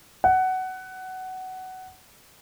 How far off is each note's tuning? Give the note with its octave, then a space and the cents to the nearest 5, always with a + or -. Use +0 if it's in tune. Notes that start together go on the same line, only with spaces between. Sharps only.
F#5 +15